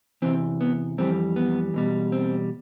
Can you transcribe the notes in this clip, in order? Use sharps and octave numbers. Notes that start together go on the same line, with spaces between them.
E2 C3 E3 C4
B3
F2 E3 G3 C4
B3
E2 B2 G3
C4